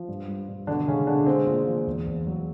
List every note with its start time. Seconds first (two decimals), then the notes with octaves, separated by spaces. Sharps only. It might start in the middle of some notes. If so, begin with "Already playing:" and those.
Already playing: F3
0.08 G2
0.28 G3
0.49 G2
0.67 B2 D3 D4
0.88 C#3 G#3 C#4
1.07 B2 D3 D4
1.27 G#3 C4
1.47 A#2
1.67 F3
1.87 E2
2.07 E2
2.27 F#3